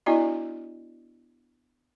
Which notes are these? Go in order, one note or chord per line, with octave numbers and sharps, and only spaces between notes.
B3 D4 E4 F#4 D5 D#5